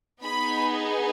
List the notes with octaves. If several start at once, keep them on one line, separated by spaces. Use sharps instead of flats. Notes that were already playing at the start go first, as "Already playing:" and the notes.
B3 D#4 G#4 B5